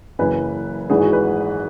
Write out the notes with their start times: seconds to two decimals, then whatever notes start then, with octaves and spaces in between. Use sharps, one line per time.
0.19 F#1 F#2 E3 B4
0.90 G#1 G#2 E3 G#4
1.01 F#4
1.13 B4